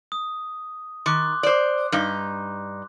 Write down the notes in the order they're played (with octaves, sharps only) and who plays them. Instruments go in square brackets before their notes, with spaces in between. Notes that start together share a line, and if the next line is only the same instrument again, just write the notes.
[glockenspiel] D#6
[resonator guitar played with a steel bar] D#3 [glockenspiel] C6 D6 F#6
[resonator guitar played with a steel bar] C5 D5
G2 D#4